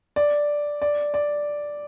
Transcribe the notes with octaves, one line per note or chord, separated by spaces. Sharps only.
D5
D5
D5